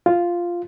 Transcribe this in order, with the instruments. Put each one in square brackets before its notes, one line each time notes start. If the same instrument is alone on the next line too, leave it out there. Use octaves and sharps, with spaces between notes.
[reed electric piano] F4